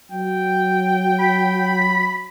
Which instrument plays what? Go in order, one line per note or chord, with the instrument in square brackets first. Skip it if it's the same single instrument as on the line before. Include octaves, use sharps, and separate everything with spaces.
[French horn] F#3 [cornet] G5
[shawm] B5